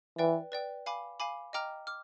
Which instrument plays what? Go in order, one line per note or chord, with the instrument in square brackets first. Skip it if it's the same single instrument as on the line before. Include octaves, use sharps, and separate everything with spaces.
[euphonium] E3 [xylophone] B4 D5 G5
[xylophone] B4 D5 G5
F5 G#5 B5 D6
F5 G#5 B5 D6
D#5 G5 A#5 D6 F6
D6 F6